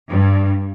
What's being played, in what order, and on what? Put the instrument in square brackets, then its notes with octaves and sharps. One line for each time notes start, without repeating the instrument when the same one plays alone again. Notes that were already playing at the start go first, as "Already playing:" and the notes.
[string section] G2